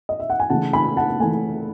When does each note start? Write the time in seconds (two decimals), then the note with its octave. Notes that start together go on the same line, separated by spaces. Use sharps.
0.09 D#5
0.20 E5
0.30 F#5
0.40 G#5
0.50 C#3 E3 A3 F#5 A5
0.73 G#5 B5
0.97 F#5 A5
1.20 E3 A3 G#5